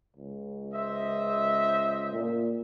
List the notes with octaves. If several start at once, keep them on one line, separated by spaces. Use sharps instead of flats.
C#2
C5 D#5 E5
A#2